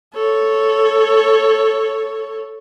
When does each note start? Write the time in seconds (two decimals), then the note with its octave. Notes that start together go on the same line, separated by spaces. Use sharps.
0.14 A4 C#5